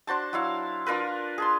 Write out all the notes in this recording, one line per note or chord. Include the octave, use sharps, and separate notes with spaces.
D4 F#4 C5 A5
F#3 E4 F5
D4 F4 A#4 B4
G#4 A5 C6